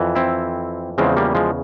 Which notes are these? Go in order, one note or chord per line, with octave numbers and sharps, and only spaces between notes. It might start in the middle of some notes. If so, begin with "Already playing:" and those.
Already playing: F2 E3
C4 E4
E2 C#3 F3 G#3 C4
G3 A#3
F3 G#3